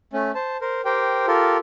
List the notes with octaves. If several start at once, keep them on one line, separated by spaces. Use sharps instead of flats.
A3 C#4
C5 A5
A#4 C5
G4 A#4 C5 G5
F4 G4 A4 A#4